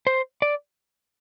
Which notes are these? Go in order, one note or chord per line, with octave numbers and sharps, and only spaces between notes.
C5
D5